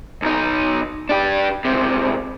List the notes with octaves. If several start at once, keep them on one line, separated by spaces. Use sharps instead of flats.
B1 D#4
D4 G4
C#2 C3